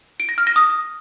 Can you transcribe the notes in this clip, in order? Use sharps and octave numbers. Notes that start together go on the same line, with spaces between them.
D7
A#6
F6
A#6
D#6